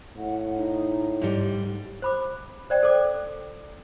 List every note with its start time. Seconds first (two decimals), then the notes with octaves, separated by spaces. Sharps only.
0.17 A2 F#5
0.56 D#4
1.21 G#2 G3
2.02 C5 B5 D6
2.70 C5 D5 G5
2.83 A4 C5 D6